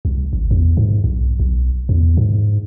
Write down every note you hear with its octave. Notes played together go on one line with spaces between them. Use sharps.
C2
A1
E2
G#2
B1
B1
E2
G#2